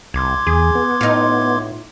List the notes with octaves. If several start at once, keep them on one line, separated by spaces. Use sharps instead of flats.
C2 C6 D6 G#6
E2 G#4
B3
A2 D#4 F4